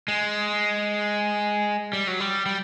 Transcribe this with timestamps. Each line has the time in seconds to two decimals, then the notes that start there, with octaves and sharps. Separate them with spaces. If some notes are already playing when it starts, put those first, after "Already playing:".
0.08 G#3
1.93 G3
2.07 F#3
2.20 G3
2.46 G3